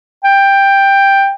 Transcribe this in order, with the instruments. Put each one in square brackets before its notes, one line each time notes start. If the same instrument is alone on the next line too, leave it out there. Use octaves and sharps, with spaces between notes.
[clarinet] G5